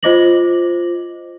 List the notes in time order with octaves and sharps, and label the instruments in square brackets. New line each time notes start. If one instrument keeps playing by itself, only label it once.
[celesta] F4 C5 D#5 D6 A#6 F#7